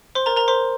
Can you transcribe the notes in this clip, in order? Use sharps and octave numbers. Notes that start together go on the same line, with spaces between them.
C5 C6
A#4 A#5
A#4 A#5
C5 C6